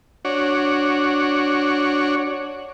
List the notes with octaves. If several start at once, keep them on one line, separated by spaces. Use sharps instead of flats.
D4 F#4 C#5